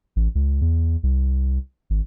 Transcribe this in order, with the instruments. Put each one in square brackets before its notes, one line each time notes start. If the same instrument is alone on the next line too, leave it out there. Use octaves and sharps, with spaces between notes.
[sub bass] A1
C#2
E2
C2
G#1